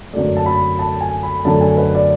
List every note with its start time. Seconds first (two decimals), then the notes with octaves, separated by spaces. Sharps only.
0.13 F#2 D3 F#3 A3 D5
0.37 A5
0.46 B5
0.79 A5
1.01 G#5
1.23 B5
1.45 F#2 D3 A3 A5
1.61 G#5
1.77 B4
1.95 D5